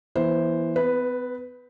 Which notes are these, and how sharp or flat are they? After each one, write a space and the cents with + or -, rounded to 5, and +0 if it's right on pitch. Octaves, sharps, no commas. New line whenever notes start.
E3 +0 B3 -45 C5 +0
B3 +40 B4 +0